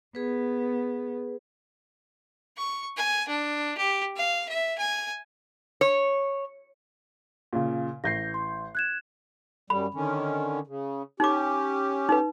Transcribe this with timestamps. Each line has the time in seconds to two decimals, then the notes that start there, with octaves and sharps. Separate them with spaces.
0.15 B3 G#4 B4
2.57 C#6
2.97 G#5
3.28 D4
3.77 G4
4.17 F5
4.48 E5
4.78 G#5
5.81 C#5
7.53 A#2 C#3
8.04 A1 G6 A#6 C7
8.34 C6
8.75 F#6 G#6 E7
9.70 F#2 G3 B5
9.94 D3 D#3 C#4
10.67 C#3
11.20 C#4 D#4 G4 D6
12.09 D#4 B4